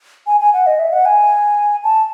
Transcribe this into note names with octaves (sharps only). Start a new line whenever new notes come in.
G#5
G#5
F#5
D#5
E5
F#5
G#5
A5